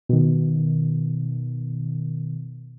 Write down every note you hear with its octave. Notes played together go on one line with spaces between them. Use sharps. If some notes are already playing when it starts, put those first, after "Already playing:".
B2 D#3